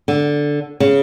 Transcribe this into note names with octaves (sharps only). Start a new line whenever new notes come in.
D3
C#3